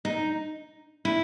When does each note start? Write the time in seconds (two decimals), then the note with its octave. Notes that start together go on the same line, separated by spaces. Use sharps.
0.05 D#4
1.05 E4